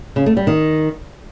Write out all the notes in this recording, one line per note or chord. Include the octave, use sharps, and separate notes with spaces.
C#3
A3
G3
D#3